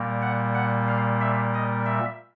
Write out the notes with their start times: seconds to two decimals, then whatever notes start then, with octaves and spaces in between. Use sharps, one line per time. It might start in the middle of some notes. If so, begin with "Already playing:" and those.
Already playing: A#2 G3 A#3
0.22 F#5
0.55 F#5
0.88 F5
1.21 E5
1.54 D#5
1.86 E5